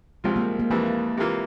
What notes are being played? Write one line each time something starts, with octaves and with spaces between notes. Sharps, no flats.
C2 C3 F3 G#3 C4 F4
A#3
A#3
F2 C3 E3 A#3
C3 E3 A#3 F4